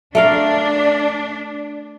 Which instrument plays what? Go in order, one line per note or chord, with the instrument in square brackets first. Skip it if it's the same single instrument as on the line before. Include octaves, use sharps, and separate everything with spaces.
[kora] A3 A#4 F5 [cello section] D4